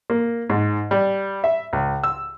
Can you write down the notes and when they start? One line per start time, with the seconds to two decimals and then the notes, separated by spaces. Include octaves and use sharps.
0.10 A#3
0.50 G#2
0.91 G3
1.44 E5
1.73 C#2
2.04 E6